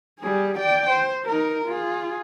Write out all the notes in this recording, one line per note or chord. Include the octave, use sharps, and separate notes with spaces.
G3 G#4
D5 G5
C5
D#4 A#4
F4 G#4